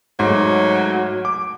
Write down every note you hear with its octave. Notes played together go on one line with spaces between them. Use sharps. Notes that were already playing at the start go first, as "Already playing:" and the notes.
G#2 F#3 A3
D6